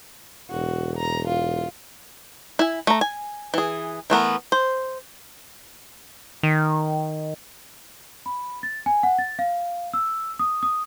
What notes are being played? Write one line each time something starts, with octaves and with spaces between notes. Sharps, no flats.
E1 F#4
A#5
F4
E4 G#5
A3 A#5
G#5
E3 G#4
E3 A3 B3 A#4
C5
D#3
B5
A6
G#5
F#5
A6
F5
E6
D#6
D#6